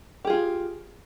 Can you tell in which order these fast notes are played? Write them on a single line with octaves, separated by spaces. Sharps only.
G4 G#4 F4